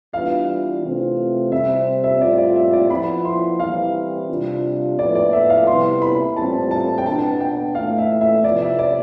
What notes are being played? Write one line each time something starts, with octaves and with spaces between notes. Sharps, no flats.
E3 G3 B3 D4 F4 F5
C3 E3 A3 C4 F4
C3 G3 C4 E5
E5
A2 G3 C4 F4 D5
D5
E5
D5
F3 B3 E4 B5
C6
E3 G3 C4 E4 F5
C3 G3 D4 F4
A2 F3 B3 E4 D5
D5
E5
F5
C3 G3 B3 E4 C6
B5
A2 E3 G3 C4 F4 A5
A5
G5
B2 B3 D4 A5
G5
A2 E3 A3 E4 F5
E5
E5
C3 F3 B3 D5
E5
D5